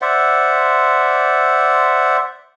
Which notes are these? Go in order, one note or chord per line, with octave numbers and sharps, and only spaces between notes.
C5 D5 E5 F#5